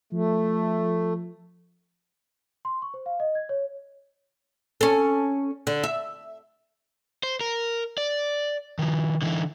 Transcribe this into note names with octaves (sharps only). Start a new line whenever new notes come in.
F3 A3
C6
C#6
C5
F5
D#5
G#6
C#5
C#4 A4
D3
E5
C5
A#4
D5
D#3 F3
D3 E3